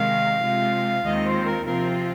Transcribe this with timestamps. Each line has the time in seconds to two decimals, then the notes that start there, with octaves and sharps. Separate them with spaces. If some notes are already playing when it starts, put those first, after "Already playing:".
Already playing: C3 D#3 G#3 F5
0.42 C3 G#3 F4
1.04 D#2 D#3 G#3 C4 F4 D#5
1.26 C5
1.46 A#4
1.66 C3 F3 C4 F4 A#4